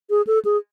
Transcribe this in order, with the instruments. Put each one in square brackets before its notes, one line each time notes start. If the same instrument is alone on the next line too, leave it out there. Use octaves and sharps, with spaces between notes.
[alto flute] G#4
A4
G#4